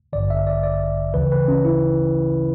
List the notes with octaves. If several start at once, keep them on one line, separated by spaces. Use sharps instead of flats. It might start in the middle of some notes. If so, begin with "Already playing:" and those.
A1 G2 D3 D5
E5
D5
D5
D2 C#3 E3 B4
B4
C#4
E4